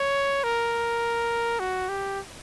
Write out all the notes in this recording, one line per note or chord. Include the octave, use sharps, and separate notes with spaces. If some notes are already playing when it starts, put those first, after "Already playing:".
Already playing: C#5
A#4
F#4
G4